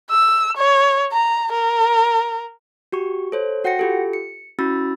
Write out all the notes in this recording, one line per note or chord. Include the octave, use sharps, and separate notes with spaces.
E6
C#5
A#5
A#4
F#4 G4 C#6
A4 C5 C#5
F#4 F#5 G5 A#6 C#7
F4 G4 A4
C#7
C#4 E4 F#4 B5 E6 A6